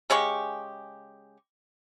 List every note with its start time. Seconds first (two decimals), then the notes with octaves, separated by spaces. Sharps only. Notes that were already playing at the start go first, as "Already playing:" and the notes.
0.10 C#3 G#3 G4 C#6